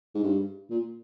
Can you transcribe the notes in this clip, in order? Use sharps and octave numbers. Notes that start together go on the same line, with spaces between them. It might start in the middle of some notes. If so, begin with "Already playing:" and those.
G#2
G2
A#2